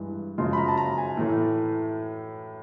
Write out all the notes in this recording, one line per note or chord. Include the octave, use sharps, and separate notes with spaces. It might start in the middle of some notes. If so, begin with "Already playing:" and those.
Already playing: G2 E3 G#3
F#2 C#3 F3 G#3 C6
B5
A#5
A5
A#5
G#5
A2 E3 A3